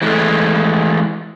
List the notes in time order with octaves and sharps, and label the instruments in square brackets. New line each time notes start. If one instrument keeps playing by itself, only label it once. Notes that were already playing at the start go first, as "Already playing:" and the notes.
[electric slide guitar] E3 G#3 A3